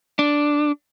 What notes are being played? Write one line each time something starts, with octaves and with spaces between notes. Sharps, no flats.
D4